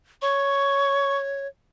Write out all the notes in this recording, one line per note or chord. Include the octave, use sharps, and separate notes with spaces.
C#5 C#6